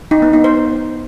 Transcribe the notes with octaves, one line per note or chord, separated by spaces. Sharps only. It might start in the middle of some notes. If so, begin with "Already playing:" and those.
D#4
B3
D#4
C5